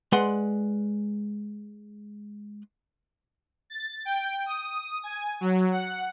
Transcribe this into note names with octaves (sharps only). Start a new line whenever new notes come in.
G#3 B4 D5 F#5 C6
A6
G5
D#6
G#5
F#3
F#5